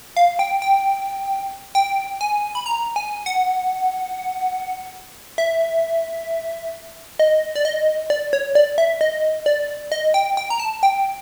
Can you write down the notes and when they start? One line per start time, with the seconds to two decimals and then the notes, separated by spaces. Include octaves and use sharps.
0.17 F5
0.39 G5
0.62 G5
1.75 G5
2.21 G#5
2.55 B5
2.66 A#5
2.96 G#5
3.26 F#5
5.38 E5
7.19 D#5
7.55 D5
7.65 D#5
8.10 D5
8.33 C#5
8.55 D5
8.78 E5
9.01 D#5
9.46 D5
9.92 D#5
10.14 G5
10.37 G5
10.50 A#5
10.60 A5
10.83 G5